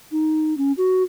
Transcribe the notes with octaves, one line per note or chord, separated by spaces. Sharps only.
D#4
C#4
F#4